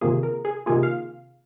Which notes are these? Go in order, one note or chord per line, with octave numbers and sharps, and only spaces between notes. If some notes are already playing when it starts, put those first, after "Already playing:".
C3 D#3 A#3 F4 G#4
A#4
G#4
C3 D#3 A#3 F4 G#4
F5